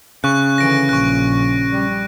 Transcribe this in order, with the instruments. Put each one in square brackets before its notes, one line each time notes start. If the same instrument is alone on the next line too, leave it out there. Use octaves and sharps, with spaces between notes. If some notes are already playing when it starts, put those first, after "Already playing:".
[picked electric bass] C#3 [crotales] C#6 F#6
[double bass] D3 E3 [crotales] A#6 D7
[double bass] A#1 [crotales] C#6 F#6
[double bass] G3